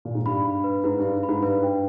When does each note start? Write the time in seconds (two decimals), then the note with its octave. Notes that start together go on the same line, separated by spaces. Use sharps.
0.05 A#2
0.15 G#2
0.26 G2 B5
0.45 B5
0.64 B4
0.84 G#2 B4
0.99 G2 B4
1.23 B5
1.29 G#2
1.42 G2 B4
1.63 G5